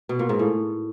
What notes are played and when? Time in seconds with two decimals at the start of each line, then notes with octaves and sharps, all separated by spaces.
0.09 B2
0.19 A#2
0.29 G#2
0.39 A2